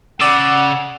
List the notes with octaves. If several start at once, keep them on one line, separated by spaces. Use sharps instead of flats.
C#3 D5 F#5 E6